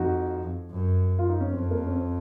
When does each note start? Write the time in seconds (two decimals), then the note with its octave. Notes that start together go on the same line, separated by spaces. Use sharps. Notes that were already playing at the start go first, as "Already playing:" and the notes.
Already playing: F2 D#4 F#4
0.72 F#2
1.19 F4
1.29 D#4
1.41 C#4
1.51 F2 C4
1.71 A#3
1.86 C#4
1.91 C4